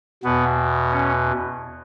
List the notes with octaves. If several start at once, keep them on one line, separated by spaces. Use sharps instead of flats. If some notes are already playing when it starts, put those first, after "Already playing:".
E2 B2 B3
C#4